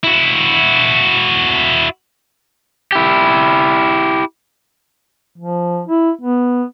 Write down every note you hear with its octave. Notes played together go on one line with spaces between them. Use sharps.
E4 F#4
E4 G4
F3
E4
B3